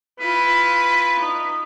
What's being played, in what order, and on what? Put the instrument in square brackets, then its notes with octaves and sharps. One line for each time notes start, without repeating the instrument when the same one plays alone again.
[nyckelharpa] E4 F4 [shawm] B4
[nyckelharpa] D#4